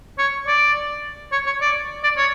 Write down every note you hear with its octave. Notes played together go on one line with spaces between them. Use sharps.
C#5
D5
C#5
C#5
D5
D5
C#5